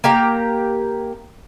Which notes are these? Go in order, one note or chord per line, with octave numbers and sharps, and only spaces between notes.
A#3 G4 A#5